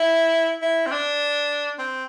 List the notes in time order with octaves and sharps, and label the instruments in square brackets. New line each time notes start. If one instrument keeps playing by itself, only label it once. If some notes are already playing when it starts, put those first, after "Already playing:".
Already playing: [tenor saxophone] E4
E4
C4
D4
C4